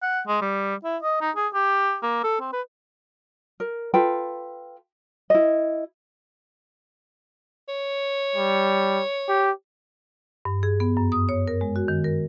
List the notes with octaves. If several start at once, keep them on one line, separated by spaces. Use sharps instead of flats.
F#5
G#3
G3
E4
D#5
D#4
G#4
G4
A#3
A4
C4
B4
A#4
F4 A4 B4 G5
E4 D#5
C#5
G3
G4
G2
G#4
B3
F#2
D#6
C#5
A#4
G#3
F#4
D#3
A#4